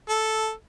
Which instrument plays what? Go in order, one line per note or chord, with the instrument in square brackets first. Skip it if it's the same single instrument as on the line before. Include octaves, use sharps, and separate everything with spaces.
[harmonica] A4